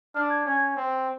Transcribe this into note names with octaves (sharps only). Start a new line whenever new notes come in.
D4 F6
G#6
C#4 G#6
C4